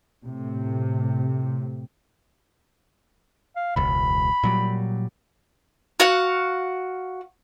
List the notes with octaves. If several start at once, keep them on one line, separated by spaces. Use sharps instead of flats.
A2 C3
F5
E1 C#2 B5
A#2 F#3 G3
F#4 F5 F#5